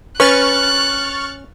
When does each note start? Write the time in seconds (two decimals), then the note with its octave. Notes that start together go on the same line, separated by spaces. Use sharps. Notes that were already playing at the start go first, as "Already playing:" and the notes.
0.20 C#4 B4 C#6 F6 F#6 A6